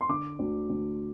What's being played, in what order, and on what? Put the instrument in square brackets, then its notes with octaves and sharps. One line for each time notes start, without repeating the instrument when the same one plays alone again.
[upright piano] C6
D3 D6
D2
D2